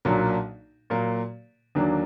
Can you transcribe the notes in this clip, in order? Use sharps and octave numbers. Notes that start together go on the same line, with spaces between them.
B1 A#2 F#3 A#3 D4
A#2 F#3 A#3
D#2 D3 F#3 A#3 D4